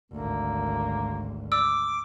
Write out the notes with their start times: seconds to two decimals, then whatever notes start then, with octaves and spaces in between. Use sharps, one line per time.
0.12 G#1 D2 A#3
1.52 D6 E6